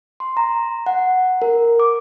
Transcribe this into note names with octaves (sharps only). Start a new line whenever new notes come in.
C6
A#5
F#5
A#4
D6